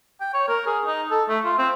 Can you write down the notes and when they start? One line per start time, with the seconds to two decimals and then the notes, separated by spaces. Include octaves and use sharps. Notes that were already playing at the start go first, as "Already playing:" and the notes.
0.21 G5
0.34 C#5
0.48 A#4
0.67 G#4
0.86 D#4
1.11 A4
1.29 A3
1.45 F4
1.58 C4